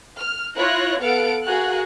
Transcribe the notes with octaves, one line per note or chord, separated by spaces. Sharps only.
F6
E4 F4 C#5 F#6 A#6
B3 A4 F5 F#5 F6 D7
F#4 G#4 A#4 F5 F#6